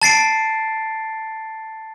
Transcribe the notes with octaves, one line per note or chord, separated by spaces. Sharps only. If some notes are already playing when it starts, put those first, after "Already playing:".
A5 A6 C7 D7